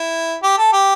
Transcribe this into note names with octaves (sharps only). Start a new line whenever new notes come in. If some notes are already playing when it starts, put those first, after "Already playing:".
Already playing: E4
G4
A4
G4